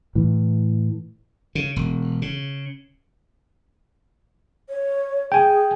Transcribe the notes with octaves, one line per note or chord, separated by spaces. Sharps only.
A2 E3
C#3
E1
C#3
C#5
G#4 G5 G#5